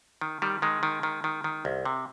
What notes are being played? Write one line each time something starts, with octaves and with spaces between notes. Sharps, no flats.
D#3
D#3 G3
D#3 G#3
D#3
D#3
D#3
D#3
C2
C3